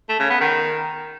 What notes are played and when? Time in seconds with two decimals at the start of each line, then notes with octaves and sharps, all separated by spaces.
0.09 A3
0.20 C#3
0.30 B3
0.41 D#3